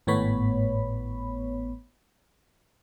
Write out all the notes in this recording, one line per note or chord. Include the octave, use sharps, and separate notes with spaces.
G#1 A2 B3 C#5 B5